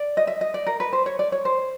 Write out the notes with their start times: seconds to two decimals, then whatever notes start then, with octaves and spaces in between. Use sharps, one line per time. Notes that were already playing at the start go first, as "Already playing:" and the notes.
Already playing: D5
0.17 D#5
0.27 E5
0.41 D#5
0.54 D5
0.67 A#4
0.80 B4
0.93 C5
1.06 C#5
1.19 D5
1.32 C#5
1.45 C5